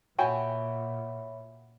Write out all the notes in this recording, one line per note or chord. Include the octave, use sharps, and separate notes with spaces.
A#2 F#4 C#5 E5 G5 G#5 B5